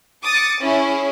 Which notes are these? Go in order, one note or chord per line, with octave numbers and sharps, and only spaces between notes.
D6 D#6 A6 C#7
C#4 E4 G#4